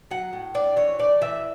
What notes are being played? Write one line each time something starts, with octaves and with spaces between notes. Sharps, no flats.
F#3 F#5
A2
D4 D5
E3 C#5
A3 D5
E3 E5